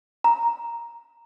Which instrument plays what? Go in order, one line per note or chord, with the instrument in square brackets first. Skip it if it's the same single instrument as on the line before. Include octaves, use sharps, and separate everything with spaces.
[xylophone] A#5